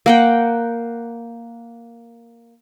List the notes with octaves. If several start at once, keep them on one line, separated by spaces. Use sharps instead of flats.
A#3 F#5 G5